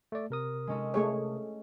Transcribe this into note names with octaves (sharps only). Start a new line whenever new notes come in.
A3 D5
C3 A#4 D#6
G#3 C#4 A4
A3 G#4 C#5